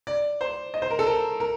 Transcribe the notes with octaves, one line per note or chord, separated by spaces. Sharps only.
D5
C5
D#5
C5
A#4
A4
A#4
A#4